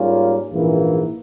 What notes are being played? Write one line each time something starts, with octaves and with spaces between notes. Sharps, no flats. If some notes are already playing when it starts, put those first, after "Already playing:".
Already playing: G#2 G3 A#3 C#4 F4
A#1 G#2 E3 A#3